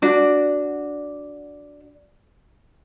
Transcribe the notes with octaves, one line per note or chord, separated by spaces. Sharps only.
D4 F#4 D5